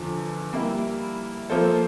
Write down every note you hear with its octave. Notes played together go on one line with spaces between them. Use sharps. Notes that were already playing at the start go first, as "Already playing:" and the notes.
Already playing: E2 D3 F3
G3 A#3 E4
F3 A#3 F4 A4 C5